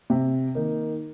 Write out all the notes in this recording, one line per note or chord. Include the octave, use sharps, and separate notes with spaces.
C3
D#3 A#3 D#4